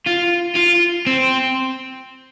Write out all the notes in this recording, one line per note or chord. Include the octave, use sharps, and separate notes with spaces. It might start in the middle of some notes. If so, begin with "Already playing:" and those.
F4
F4
C4